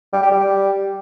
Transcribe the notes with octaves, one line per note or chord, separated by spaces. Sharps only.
G3
G4
G3